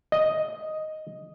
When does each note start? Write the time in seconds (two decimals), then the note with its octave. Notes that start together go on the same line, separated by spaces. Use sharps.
0.12 D#5